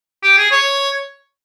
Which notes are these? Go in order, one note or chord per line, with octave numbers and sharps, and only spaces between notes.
G4
G#4
C#5